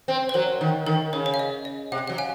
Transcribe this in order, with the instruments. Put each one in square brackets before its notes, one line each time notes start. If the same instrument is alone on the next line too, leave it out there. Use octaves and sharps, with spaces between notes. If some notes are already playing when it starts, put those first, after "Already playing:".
[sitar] C4
[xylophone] C5
[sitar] F#3 [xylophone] A#4
[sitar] D#3
[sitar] D#3 [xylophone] A#4
[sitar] C#3 [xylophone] C#5
[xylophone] C#5
F5
D#5
D#5
[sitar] C3 [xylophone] F#5
[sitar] F#3 [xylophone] F#5
[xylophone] F5 G#5